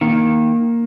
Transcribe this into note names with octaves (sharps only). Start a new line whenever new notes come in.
D#3 A#3